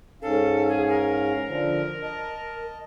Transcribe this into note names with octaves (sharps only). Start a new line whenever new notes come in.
G#2 C#4 A4 F5
G#4
A#4
D3 F3
D#5 A5